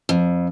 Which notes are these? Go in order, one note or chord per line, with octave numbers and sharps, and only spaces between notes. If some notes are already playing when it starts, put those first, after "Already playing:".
F2